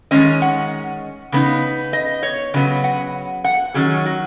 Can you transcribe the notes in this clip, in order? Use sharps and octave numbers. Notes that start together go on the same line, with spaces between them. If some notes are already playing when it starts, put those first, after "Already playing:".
D#3 G#3 C#4 D#5
F#5
C#3 B3 D#4
D#5
C#5
C#3 F#3 B3 D#5
F#5
F#5
D#3 F#3 C#4 G#4
F#4